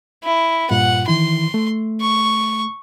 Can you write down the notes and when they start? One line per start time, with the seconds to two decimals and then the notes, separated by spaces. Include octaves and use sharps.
0.24 E4
0.71 G2 A#2 F4 F#5
1.08 D#3 E3 E4 C6
1.54 A3
2.01 C#6